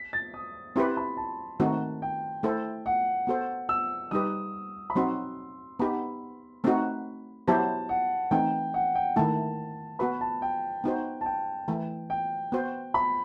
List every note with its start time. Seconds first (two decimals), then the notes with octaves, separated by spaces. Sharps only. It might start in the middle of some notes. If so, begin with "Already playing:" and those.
Already playing: B6
0.13 A6
0.34 D#6
0.76 C4 E4 G4 B4 C6
0.97 B5
1.17 A5
1.60 D#3 A3 C4 D#4 F#4
2.02 G5
2.43 A3 E4 A4 C5
2.86 F#5
3.27 B3 F#4 A4 C5
3.69 E6
4.11 G3 D#4 G4 B4 D#6
4.90 B5
4.95 F#3 C4 D#4 F#4 C6
5.79 B3 D#4 G4 B5
6.64 A3 C4 D#4 F#4
7.48 F#3 B3 E4 G4 C5 A5
7.89 F#5
8.31 E3 A3 C4 D#4 G5
8.74 F#5
8.95 G5
9.16 D#3 A3 E4 A5
9.99 B3 F#4 B4 B5
10.21 A5
10.42 G5
10.84 B3 D#4 F#4 C5
11.21 A5
11.26 G5
11.68 E3 A3 E4
12.10 G5
12.52 B3 F#4 C5
12.94 B5